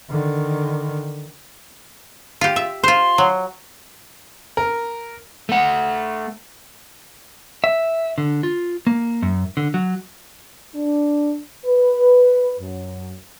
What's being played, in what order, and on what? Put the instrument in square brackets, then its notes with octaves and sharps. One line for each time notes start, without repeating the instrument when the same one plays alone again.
[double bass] D3 D#3
[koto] F4 G4
E5
[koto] F4 C5 [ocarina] C6
[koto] F#3
[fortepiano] A#4
[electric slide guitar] A3 F#5
E5
D3
F4
A#3
F#2
D3
F#3
[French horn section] D4
B4
F#2